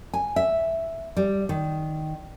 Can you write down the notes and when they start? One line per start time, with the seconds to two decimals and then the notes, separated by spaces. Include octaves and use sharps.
0.13 G#5
0.36 E5
1.17 G3
1.49 D#3